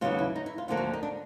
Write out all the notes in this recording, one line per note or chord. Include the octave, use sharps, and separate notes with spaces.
D#2 C#3 F#3 B3 F4
E4
D#4
E4
F4
D2 D3 F3 A#3 F4
F#4
D#4
D4